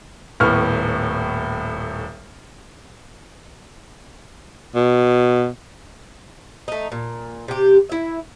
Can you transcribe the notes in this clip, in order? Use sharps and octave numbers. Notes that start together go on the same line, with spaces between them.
D#1 A2 B3 C#6 F6
B2
A3 D#4
A#2
C3 G4
E4 E5